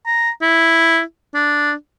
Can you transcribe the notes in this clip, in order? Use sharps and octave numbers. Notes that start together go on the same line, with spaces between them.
A#5
E4
D4